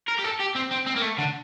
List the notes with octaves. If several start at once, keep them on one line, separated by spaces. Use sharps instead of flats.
A#4
G4
A4
G4
C4
C4
C4
A#3
A3
D3